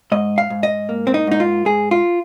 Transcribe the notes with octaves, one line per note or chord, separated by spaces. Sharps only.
G#2 D#5
F5
G#2
D#5
A#3
C4
D#4
G#2 D#4
F4
G#2 G#4
F4